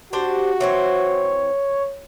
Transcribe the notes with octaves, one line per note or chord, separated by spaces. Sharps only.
D4 F#4 G4 C5
E3 C4 C5 C#5